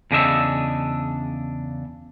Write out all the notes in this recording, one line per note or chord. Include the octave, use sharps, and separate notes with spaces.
E2 C#3 D4 D#5 E5